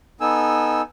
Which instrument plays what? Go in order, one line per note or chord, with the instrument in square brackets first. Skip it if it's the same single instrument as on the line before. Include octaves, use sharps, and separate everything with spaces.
[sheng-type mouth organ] B3 D#4 A4 G#5 E6